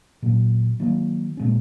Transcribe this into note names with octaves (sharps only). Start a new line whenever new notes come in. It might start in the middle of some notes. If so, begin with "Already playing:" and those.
A#2 F#3 C#4
D#3 F#3 A#3
A#2 G#3 C#4